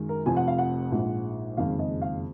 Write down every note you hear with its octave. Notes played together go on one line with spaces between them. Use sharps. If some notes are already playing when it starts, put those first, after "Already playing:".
Already playing: F#2 D#3 G#3
A#4
F1 F2 F3 G#5
F#5
F5
F#5
A#1 G#2 F3 G#3
F#1 F2 D#3 G#3 F5
D#5
F5